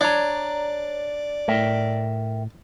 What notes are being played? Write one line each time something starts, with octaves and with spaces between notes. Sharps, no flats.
D4 C#5 D5 A#5
A2 A#4 E5 G5